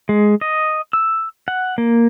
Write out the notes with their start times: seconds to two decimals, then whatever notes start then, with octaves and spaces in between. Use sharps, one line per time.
0.09 G#3
0.41 D#5
0.93 E6
1.48 F#5
1.78 A#3